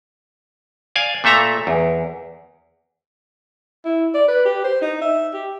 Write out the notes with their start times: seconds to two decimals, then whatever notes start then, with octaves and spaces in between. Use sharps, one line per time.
0.96 D5 F5 G#5
1.24 A#2 A3 A4 E5 A#5
1.67 E2
3.85 E4
4.14 D5
4.28 B4
4.45 G4
4.64 C5
4.82 D#4
5.01 E5
5.34 G4